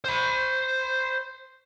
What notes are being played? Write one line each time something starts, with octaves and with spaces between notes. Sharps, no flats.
C5 B5